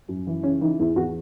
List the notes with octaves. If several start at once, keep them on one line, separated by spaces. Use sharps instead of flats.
F#2
E3
C#3 C#4
E3 D#4
E2 E4
E2 F#4